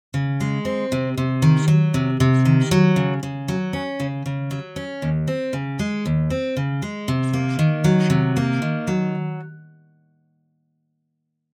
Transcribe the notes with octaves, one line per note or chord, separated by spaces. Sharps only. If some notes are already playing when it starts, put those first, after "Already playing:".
C#3
G#3
C4
C3
C3
D#3
F#3
C3
C3
D#3
F#3
C#3
C#3
F#3
C#4
C#3
C#3
F#3
C#4
D#2
C4
C#3
G#3
D#2
C4
C#3
G#3
C3
A#3
D#3
F#3
C3
A#3
D#3
F#3